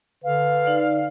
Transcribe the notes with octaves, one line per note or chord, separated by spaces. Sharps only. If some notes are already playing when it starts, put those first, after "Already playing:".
D3 B4 F5
D#4 D5